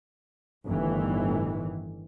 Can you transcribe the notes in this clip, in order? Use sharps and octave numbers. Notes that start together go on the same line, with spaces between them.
G1 A2 D#3 E3